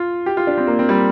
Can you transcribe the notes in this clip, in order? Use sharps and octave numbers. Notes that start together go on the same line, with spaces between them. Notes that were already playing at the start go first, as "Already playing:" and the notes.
Already playing: F4
G4
F4
D4
C4
A#3
C4
G3